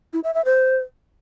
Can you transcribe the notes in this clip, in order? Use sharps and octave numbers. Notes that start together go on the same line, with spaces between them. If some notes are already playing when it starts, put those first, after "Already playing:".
E4
E5
E5
C5